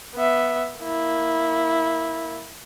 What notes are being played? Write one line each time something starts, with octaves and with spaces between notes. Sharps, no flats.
B3 E5
A#3 E4